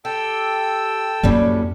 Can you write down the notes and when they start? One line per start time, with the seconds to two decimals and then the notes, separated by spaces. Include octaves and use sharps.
0.05 G4 A4 G5 E6
1.23 F#2 A2 G3 A#3 C#4